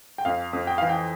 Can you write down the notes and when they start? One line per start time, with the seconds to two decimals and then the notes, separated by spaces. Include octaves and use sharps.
0.18 G5
0.25 F2 F5
0.53 F2
0.67 G5
0.78 E3 F5
0.89 G5